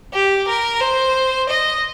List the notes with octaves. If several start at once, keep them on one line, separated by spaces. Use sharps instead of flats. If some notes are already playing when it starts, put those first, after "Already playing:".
G4
A#4
C5
D#5